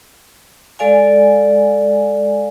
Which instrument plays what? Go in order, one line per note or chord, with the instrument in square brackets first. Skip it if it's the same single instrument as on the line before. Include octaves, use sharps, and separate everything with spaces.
[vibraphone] G#3 A4 D5 F5 G#5